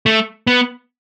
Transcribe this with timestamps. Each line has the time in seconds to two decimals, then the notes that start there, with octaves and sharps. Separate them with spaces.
0.06 A3
0.47 B3